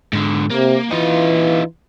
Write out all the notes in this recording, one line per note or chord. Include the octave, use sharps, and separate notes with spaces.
G#2 D3
C3 A#3
E3 D#4 F4